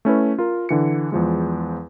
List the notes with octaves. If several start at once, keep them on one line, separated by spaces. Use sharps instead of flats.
A3 C#4 E4 B4
F4 A#4
D3 E3 C#7
E2 F3 G#3